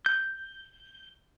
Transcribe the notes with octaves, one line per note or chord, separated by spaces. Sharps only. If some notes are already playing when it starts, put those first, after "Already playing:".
G6